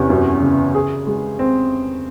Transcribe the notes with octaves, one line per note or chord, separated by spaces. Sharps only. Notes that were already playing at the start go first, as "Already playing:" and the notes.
Already playing: E2 C3 C#4
F#2
C#3
G#4
G#3
C4